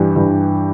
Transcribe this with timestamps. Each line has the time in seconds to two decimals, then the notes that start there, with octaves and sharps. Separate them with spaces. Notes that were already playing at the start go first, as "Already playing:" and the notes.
Already playing: G2 E3 G4
0.16 G2 E3